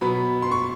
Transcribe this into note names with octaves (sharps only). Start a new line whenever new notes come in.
B2 F#3 B3 B5
C6
C#6